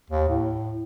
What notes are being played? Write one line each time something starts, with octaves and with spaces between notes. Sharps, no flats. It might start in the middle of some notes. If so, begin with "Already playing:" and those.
D#2
A2